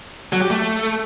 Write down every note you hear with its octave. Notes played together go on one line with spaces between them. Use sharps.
F#3
G4
A3